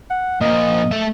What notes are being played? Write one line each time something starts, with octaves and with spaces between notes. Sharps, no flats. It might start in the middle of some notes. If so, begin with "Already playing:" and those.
F#5
A#2 F3 D#5
A3 E5